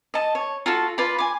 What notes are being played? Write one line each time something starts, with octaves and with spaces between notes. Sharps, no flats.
D#5 A5
C#5
F4 F#4 A4
F4 B4 D5 B5
G#5 D6